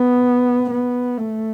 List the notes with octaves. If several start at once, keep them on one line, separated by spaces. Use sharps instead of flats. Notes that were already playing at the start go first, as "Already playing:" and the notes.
Already playing: B3
B3
A3